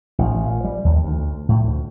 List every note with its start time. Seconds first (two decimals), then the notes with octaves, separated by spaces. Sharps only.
0.19 A1
0.46 A#2
0.65 G3
0.85 D#2
1.04 D2
1.49 A2
1.64 D2